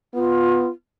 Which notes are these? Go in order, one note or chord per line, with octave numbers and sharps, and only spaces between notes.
B3 F4